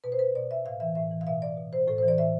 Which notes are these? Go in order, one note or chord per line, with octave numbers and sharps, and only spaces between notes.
B2 B4
C5
B4
B2 D5
E5
A2 F5
E3 E5
A2 E5
E3
F5
B2 E5
D5
B2
C5
A2 A4
C5
E3
D5
A2 E5